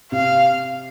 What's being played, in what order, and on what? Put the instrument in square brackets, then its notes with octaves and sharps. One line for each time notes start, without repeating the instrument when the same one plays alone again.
[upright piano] C3 [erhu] F5